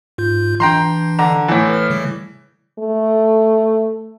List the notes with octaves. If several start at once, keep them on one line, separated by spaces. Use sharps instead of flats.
G#2 F4 G6
E3 D4 G5 A#5 C6
D3 A#5
A2 E3
B4 F6
C#3 G3
A3